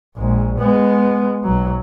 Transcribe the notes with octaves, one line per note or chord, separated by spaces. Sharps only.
A#1 G#3
G#3 B3
B1 F#3